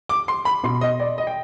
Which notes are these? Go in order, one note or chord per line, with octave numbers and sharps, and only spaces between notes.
D6
C6
B5
B2 C6
D#5
D5
D#5
G5